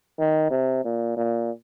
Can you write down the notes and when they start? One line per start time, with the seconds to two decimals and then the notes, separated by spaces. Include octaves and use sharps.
0.19 D#3
0.51 C3
0.85 A#2
1.17 A#2